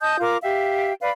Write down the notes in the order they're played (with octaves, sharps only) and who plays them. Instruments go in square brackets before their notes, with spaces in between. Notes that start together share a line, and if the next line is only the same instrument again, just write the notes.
[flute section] D#5 A5 D#6 G6
F4 A#4 D6
G4 E5 F5 G5
B4 D5 F5 B5